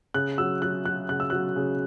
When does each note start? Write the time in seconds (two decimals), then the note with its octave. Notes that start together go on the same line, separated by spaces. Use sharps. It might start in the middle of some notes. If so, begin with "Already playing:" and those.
0.14 C#3 F#6
0.38 F#3 E6
0.62 F#3 F#6
0.85 F#3 F#6
1.09 C#3 F#6
1.20 E6
1.30 F#3 F#6
1.56 C#3